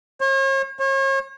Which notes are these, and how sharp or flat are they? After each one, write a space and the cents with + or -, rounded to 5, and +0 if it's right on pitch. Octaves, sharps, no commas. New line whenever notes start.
C#5 -45
C#5 -40